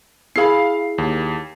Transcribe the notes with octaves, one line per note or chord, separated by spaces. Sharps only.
E4 G#4 F5 B5 C7
D#2